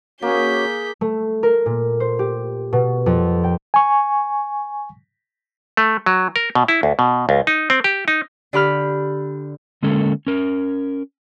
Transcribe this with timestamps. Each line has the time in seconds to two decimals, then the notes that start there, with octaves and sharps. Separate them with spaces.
0.22 A#3 C#4 F#4 G#4 C#5 G6 B6
1.01 A3
1.43 A#4
1.66 A#2
2.00 C5
2.19 G4
2.73 B2
3.06 F2
3.44 G5
3.74 G#5 C#6
5.77 A3
6.06 F#3
6.36 A#4
6.55 B2
6.68 E4
6.83 D2
6.99 B2
7.29 C#2
7.47 D#4
7.70 C4
7.84 G4
8.08 D#4
8.53 D3 G4 B5 F6
9.83 D3 G#3 A#3 C#4 A4
10.27 C#4 A#4